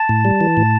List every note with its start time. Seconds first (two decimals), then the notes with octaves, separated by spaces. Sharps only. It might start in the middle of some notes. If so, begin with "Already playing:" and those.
Already playing: A5
0.09 A2
0.25 G3
0.41 E3
0.57 A2